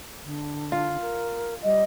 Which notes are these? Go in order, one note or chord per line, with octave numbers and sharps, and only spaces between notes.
D3
F4
A#4
G3 D#5